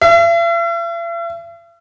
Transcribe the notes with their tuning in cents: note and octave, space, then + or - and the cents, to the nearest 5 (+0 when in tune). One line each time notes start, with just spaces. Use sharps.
E5 +45